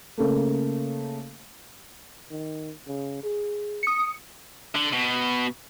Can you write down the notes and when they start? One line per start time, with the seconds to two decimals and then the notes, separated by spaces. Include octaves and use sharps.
0.18 C#3 A3 A#3
2.31 D#3
2.87 C#3
3.23 G#4
3.83 D#6 C#7
4.75 D3
4.93 B2